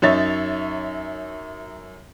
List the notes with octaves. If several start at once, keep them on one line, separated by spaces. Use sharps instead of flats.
F#2 D#4 C#5 E5 A6